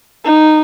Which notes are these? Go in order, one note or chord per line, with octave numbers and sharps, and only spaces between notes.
D#4